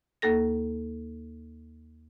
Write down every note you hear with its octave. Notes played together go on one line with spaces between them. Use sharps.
D#2 A#3 A4 A#6